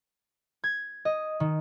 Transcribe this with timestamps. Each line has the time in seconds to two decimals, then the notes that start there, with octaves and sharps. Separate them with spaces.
0.64 G#6
1.05 D#5
1.40 D#3